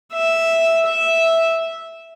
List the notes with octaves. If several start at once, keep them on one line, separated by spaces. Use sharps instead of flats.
E5
E5